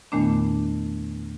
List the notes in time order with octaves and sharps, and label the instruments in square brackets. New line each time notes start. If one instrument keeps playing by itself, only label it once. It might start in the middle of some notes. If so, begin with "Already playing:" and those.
[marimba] E2 A#2 D#3 A3 B3 D4